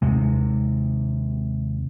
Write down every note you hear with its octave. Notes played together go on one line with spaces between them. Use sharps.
D#2 C3 G#3